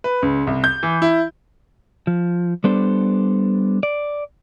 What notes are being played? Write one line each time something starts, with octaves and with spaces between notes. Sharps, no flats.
B4
C#2
C2
G6
E3
E4
F3
G3 B3 D4 A4 C5
D5